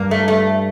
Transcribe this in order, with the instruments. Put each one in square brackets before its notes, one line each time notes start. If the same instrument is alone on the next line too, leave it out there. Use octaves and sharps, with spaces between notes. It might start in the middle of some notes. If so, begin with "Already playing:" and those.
Already playing: [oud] G2 [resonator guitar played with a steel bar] A#3
[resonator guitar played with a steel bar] A3
A3